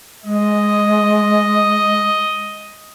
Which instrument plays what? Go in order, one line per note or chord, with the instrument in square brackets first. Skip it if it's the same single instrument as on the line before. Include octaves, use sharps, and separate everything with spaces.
[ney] G#3 [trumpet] D#5